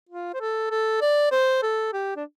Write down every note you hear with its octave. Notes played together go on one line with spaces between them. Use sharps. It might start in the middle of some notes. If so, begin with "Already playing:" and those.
F4
C5
A4
A4
D5
C5
A4
G4
D4